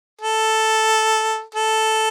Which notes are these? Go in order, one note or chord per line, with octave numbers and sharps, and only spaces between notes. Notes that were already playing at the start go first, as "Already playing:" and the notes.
A4
A4